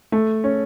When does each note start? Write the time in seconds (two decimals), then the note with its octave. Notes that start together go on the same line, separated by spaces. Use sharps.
0.12 A3
0.44 C#4